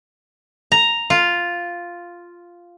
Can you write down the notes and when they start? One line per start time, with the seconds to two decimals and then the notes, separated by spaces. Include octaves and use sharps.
0.72 A#5
1.10 F4